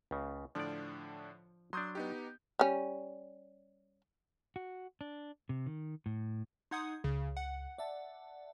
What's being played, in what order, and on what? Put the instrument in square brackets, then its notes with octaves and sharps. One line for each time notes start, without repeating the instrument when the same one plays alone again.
[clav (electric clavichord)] C#2 C#3
[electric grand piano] A2 D3 D4 [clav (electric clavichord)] F3 D5
[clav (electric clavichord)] F#3 D4 [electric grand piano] C6 D#6 G6
[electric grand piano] B3 D#4 G4
[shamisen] G3 C#4
[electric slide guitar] F#4
D4
C3
D#3
A2
[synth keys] D#4 F#5 D#6 [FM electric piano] C6 G6 G#6
[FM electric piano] C#2 [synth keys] C#3
[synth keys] F#5
[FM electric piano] D5 E5 A5